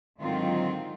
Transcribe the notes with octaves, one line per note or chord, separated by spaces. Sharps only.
G#2 D3 D#3 F#3 C4 F4